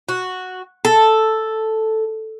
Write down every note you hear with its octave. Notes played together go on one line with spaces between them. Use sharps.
F#4
A4